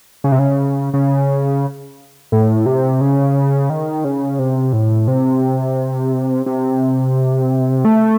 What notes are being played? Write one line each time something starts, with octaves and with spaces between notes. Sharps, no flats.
C#3
C3
C#3
C#3
A2
C3
C#3
D#3
C#3
C3
A2
C3
C3
A3